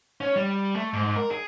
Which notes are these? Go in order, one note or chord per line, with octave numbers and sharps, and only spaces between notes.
C#4
G3
A3
G#2
A#4
G#4